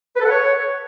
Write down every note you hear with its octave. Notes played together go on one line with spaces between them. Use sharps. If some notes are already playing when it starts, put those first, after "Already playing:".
B4
A4
F#5
C#5